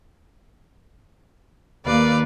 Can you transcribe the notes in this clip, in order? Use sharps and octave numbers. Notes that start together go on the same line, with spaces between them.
D#2 A#3 B4 D5 F5